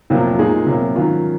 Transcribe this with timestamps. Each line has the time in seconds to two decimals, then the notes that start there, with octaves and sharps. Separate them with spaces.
0.10 F2 C3 F#3 A#3
0.39 A#2 G#3 D#4 G#4
0.67 C3 F#3 A#3
0.95 G#2 D#3 F#3 C#4 F4